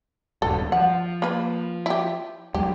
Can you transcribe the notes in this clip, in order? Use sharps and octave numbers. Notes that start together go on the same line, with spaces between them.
D#1 C#2 G2 A4
F3 F#5
A#3 B4
E4 G4
E2 F#3 G#3 G4